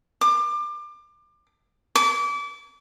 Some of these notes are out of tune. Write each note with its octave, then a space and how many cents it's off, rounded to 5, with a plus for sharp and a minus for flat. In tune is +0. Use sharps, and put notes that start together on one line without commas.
D6 +30
D6 -30